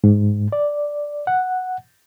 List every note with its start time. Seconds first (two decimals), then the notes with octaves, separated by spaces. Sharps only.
0.04 G#2
0.52 D5
1.27 F#5